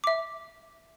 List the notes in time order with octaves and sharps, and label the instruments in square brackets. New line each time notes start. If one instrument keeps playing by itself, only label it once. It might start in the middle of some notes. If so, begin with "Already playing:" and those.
[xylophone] E5 D6